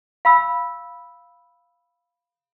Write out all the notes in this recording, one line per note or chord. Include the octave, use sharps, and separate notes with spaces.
F5 B5 E6